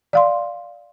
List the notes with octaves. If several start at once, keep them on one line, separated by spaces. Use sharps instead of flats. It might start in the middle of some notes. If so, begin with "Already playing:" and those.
D5 F5 C6